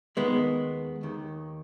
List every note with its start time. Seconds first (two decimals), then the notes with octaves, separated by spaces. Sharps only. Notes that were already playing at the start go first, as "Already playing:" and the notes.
0.16 D#2 D#3 G#3 B3
1.03 D#2 D#3